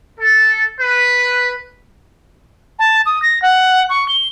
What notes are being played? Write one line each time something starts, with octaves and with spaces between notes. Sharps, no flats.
A4
B4
A5
D#6
A#6
F#5
C#6
G7